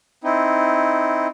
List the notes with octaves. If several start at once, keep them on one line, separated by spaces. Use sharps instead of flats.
C4 D#4 E4